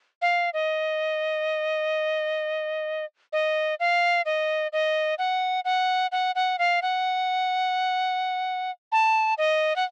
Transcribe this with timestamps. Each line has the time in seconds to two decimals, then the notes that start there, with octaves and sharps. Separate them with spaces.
0.22 F5
0.54 D#5
3.33 D#5
3.80 F5
4.26 D#5
4.73 D#5
5.18 F#5
5.65 F#5
6.12 F#5
6.35 F#5
6.59 F5
6.82 F#5
8.92 A5
9.38 D#5
9.76 F#5